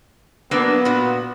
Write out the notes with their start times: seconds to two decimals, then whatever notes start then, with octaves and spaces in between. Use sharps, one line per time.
0.51 F#3 A#3 B3 D4
0.85 A#2 F#4